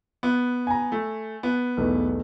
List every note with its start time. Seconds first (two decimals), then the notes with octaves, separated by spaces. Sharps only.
0.23 B3
0.67 G#5 A#5
0.92 A3
1.43 B3
1.77 B1 E2 A3